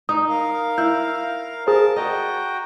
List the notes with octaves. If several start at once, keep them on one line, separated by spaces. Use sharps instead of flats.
D#4 D#6
A#4 F5
E4 G6
G#4 A#4 C5 A5
F#4 D#5 G5 A#5